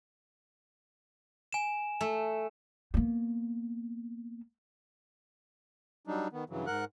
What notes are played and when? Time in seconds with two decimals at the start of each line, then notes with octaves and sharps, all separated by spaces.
1.53 G#5 E7
2.01 A3
2.94 A#3 B3
6.07 F#3 G3 D4 D#4
6.33 D#3 B3
6.50 G2 C#3 E3 F#3
6.67 G#2 A#4 F#5 F#6